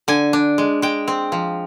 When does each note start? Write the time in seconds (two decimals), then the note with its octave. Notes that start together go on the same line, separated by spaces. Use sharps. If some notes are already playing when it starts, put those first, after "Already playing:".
0.08 D3 G#5
0.33 D4
0.58 G#3
0.82 G#3 G5
1.08 C4
1.32 F3